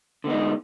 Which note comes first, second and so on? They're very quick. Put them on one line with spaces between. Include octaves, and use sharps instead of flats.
D3 B3 D#4 G#3